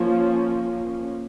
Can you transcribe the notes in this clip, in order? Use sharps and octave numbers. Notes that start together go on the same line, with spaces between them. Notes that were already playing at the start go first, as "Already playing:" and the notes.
Already playing: F3 A#3 C#4